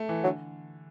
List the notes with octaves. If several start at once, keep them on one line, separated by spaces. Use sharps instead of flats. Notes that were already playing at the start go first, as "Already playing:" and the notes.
Already playing: A3
E3
D3 F#3